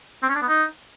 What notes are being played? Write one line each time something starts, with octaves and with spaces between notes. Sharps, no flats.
C4
C#4
D4
B3
D#4